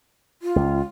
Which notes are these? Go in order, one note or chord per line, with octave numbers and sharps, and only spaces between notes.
F4
C#2